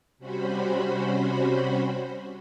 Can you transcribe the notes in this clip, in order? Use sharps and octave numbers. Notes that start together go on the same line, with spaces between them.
C3 G3 C#4 F#4 C5 B5